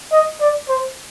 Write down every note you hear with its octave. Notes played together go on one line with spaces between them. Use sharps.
D#5
D5
C5